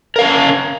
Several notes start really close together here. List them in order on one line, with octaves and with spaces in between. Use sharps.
A#4 F5 C#4